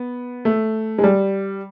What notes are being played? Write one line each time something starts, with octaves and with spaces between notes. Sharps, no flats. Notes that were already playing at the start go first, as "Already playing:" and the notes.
Already playing: B3
A3
G#3
G3